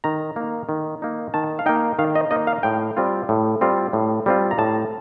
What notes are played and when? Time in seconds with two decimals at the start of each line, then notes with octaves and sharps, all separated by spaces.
0.04 D#3 A#5
0.36 A#3 D#4
0.69 D#3
1.02 A#3 D#4
1.34 D#3 A5
1.59 F5
1.66 A#3 D#4 G5
1.99 D#3 F5
2.15 D#5
2.31 A#3 D#4 D#5
2.47 F5
2.63 A2 G5
2.97 G3 C4 F4
3.29 A2
3.61 G3 C4 F4
3.93 A2
4.26 G3 C4 F4
4.51 A#5
4.58 A2 A5